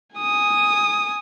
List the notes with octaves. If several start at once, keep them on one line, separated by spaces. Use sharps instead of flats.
G#5 D#6